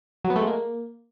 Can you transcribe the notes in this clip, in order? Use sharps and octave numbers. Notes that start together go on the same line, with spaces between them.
F#3
B3
A3
G#3
A#3